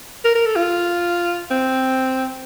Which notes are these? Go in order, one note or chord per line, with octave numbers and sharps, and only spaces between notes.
A#4
A#4
A4
F4
C4